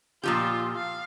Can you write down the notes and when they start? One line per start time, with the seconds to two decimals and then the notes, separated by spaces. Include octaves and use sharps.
0.24 A#2 F3 F4 G4
0.75 F5